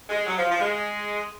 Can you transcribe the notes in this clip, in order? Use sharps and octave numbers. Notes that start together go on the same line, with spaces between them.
G#3
F#3
F3
F3
G#3